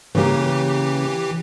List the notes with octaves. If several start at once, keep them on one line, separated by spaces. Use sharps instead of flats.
C#3 E3 A#3 G4